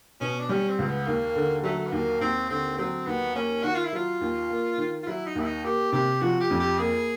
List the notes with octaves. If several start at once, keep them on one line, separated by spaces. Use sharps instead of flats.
B2 C#4
D4
G3 C#4
C4
C#2
B3
D#2 A#3
D3
F#3 A3
B3
D#2 A#3
D#2 C4
D3 C4
F#3 C4
D#2 B3
A#3 C#4
D#3 F#4
F4
E4
F#3 F4
D#2
A#3
D#3
F4
F#3 E4
D#4
D#2 E4
D#4
A#3 G4
C3 G4
F3 F#4
G4
F2
G4
A#3 G#4